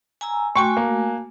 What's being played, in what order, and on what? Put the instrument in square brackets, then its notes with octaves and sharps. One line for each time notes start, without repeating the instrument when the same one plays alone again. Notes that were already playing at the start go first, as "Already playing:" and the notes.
[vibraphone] G#5 A#5 E6
[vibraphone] A3 F#4 G#5 [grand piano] G5 C6 C#6
[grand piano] A#3